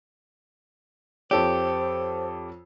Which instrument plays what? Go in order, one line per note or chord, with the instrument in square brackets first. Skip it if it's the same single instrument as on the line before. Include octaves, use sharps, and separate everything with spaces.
[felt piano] F2 A4 C#5 [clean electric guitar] G4 [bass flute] C5